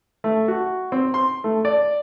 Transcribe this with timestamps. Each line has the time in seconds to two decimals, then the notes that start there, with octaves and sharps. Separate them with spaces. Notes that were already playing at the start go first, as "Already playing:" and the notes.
0.24 A3
0.48 F#4
0.92 C4
1.14 C6
1.44 A3
1.65 D5